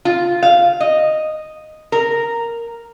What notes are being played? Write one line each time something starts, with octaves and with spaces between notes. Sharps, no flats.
F4
F5
D#5
A#4